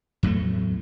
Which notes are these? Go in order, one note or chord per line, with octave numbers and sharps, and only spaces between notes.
E2 A2 F#3 A3